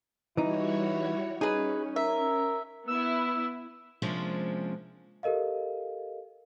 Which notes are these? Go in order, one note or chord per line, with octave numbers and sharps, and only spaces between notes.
E3 G3 D#4 E4 F#4 C#5
C#4 D#4 G#4 B4
A#4 E5
B3 E4 E6
C3 F3 G#3 A#3 C#4 D4
G4 A4 A#4 D#5 F5